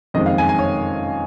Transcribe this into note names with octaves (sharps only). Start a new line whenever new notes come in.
F#1 F2 D#3 G#3 C4 D#5
F5
G#5
G#5
C#5